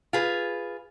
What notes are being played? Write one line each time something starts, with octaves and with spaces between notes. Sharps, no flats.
F4 G#4 B4